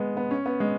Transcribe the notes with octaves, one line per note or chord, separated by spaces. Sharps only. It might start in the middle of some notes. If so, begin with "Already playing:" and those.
Already playing: G#3 B3
B3
C#4
B3
G#3